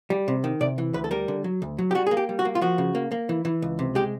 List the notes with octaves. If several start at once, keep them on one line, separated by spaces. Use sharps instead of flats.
G3
C3
D#3
C3 D5
E3
D2 B4
A4
G3 A#4
D3
F#3
D2
F#3
G4
G3 F#4
A#3 G#4
G4
G3
F#4
A#3
F4
F3 F#4
C#3
A#3
A#3
E3
E3
C#2
C3
G#3 G4